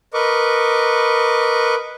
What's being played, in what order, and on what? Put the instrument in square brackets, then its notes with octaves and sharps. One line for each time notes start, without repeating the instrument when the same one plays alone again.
[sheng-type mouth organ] A#4 B4 D#5 C#6 D6